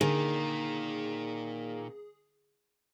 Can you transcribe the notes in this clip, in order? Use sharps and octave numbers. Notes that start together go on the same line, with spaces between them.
A#2 D3 D#3 A#3 D4 G#4